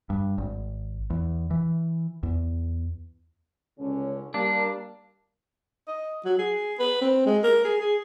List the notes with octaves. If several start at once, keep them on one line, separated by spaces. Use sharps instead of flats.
G2
G#1
E2
E3
E2
C#2 D3 C#4
G3 A#3 D4
D#5
F#3
G#4
B4
C4
G#3
A#4
G#4
G#4